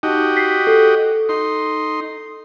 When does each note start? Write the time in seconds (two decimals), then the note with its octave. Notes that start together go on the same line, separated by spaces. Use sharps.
0.03 D#4 F#4 G4 D#5
0.37 B6 C7
0.67 A4
1.29 D#4 C6